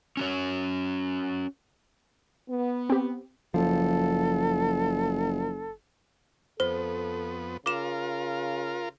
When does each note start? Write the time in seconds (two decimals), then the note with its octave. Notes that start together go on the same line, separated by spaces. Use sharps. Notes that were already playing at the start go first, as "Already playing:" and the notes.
0.17 C#4 F#4 C#5
2.49 B3
2.90 C4 G4
3.54 F#1 F3 A4
6.60 F2 B3 A4 C5
7.66 C#3 F4 A#4 D6 E7